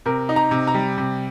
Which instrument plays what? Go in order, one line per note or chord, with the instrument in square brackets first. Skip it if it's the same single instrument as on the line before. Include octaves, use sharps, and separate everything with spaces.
[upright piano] C3 A#4
D#4
A#5
C3
A#5
G3
C3